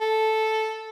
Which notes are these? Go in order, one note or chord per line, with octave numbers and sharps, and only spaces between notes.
A4